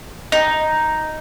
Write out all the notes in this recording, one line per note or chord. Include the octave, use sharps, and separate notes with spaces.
D#4